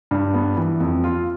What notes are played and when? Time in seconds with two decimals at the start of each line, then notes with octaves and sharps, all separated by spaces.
0.11 G2
0.34 B3
0.57 E3
0.80 F2
1.04 F4